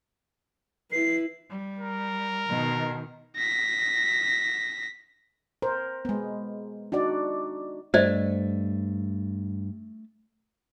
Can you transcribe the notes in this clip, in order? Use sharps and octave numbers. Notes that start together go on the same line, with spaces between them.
E4 B4 C7
G3
A#4
B2 D#3
A#6 B6
A#4 C5
G#3 B3
D4 D#4 F#4 D5
G2 A3 C5 D5 D#5